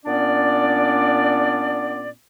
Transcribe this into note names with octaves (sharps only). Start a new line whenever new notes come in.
A#2 B3 C#4 D4 D5